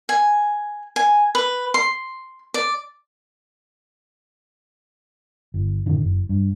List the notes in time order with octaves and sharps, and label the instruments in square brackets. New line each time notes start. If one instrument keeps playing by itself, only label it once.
[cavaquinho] G#5
G#5
B4
C6
D5
[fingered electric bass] G1
F#1 A2 D3 D#3
F#1
G2